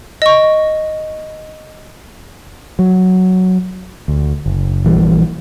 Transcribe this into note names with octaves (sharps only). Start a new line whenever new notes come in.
D#5 C#6
F#3
D2
F#1
A#1 E3 G3